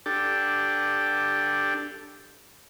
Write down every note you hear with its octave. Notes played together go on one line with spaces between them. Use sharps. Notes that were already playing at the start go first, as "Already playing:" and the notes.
D4 G4 A4